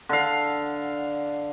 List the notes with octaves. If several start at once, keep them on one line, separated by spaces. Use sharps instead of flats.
D3 F5